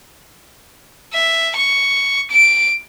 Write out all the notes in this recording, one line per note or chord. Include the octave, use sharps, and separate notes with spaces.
E5
C#6
D7